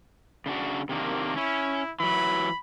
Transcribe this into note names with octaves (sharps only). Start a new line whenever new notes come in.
C#3 D4 F#4
C3 D#3 A#3 D4
C#4 E4
E3 F#3 B5